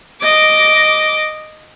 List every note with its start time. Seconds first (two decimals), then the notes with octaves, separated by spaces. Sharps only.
0.22 D#5 D6